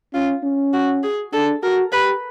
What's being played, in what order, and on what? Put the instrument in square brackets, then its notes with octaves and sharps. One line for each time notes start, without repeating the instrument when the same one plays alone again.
[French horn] C#4 [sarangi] F4
[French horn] C#4
[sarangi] F#4
G#4
[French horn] D4 [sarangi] A4
[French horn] F#4 [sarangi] A#4
[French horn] G4 [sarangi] B4